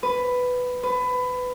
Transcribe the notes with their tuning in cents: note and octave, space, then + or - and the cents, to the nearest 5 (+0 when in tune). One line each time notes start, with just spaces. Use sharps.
B4 +10
B4 +20